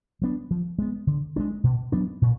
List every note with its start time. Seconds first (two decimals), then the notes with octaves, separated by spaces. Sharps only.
0.22 F#3 B3 D4
0.51 F3
0.78 G#3 B3
1.07 D3
1.36 G#3 B3 D4
1.64 B2
1.92 F#3 B3 D4
2.22 A#2